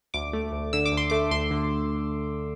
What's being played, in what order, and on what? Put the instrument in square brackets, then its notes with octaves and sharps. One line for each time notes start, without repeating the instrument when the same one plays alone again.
[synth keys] D2 D6
A3
D2
D3 E6
D6
D2
C6
A3 D6
D2 C6
D3